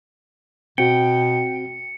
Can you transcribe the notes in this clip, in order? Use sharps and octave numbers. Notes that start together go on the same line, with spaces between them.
B2 C4 F#4 G5 C#7